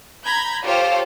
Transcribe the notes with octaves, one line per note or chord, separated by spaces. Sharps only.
A#5 B5 G6 G#6
F4 G4 A4 C5 C#5 F5